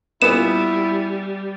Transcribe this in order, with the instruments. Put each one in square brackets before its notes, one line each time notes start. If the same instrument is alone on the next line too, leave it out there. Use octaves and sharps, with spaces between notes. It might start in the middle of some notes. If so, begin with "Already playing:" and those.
[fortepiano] A#2 B3 [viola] G3 [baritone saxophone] E4 [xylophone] E7